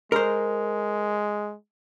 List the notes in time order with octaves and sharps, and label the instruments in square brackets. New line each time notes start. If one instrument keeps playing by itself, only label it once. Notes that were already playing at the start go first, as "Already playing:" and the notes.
[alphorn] G#3 [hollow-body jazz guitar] A#4 C5